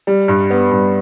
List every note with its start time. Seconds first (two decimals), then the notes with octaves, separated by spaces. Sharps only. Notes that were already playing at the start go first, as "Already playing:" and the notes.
0.07 G3
0.28 G2
0.50 B3
0.71 G2